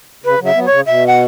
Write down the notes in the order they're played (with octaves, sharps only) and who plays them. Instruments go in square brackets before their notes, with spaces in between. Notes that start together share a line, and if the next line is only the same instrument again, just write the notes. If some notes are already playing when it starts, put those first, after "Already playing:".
[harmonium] C#3 [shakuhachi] B4
[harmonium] C#3 F#3
[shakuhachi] E5
[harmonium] F#3 B3
[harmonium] C#3 [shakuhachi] C#5
[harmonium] B2 [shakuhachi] E5
[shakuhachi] F#5